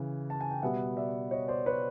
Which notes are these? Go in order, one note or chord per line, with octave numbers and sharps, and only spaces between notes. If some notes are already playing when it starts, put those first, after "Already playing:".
Already playing: C#3 E3
A5
G#5
G5
B2 G3 B3 E5 F#5
D5 E5
C#5 D#5
C5 D5
B4 C#5